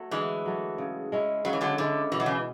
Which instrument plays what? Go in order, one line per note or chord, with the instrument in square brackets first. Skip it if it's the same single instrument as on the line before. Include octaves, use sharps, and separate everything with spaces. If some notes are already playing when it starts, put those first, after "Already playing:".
Already playing: [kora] F#3 A3
[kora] D3 [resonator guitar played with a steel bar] E3 G#3
[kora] F#3 A3
C#3
G#3 C#4 E4
[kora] C#3 [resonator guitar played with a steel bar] F#3
[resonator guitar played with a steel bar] E3
D3 F#3
[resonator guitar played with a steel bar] D3 [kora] G#3 C#4 E4
[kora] B2 [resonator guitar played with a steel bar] E3
[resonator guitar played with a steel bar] F#3
C#3 E3